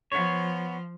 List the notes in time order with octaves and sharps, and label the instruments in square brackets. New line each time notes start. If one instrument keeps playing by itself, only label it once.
[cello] F3 [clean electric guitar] B3 C#5